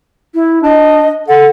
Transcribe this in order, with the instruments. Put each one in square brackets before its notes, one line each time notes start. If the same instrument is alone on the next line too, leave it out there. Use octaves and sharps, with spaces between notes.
[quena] E4
[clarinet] D4 [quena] D#5
[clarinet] A4 [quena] F#5